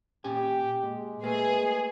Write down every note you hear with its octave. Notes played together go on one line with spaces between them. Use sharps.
A#2 C#4 G4 G#5
A#2 G#3
A3 A#3 G#4 B4